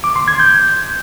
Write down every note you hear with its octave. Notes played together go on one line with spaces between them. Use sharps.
D6
C6
G#6
G6